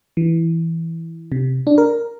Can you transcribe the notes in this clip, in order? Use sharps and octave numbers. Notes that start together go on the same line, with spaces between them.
E3
C3
D4
A#4